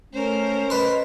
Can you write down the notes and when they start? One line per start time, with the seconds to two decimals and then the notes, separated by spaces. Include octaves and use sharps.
0.13 A3 C#4 A#4 C5
0.70 B4 D#5 C6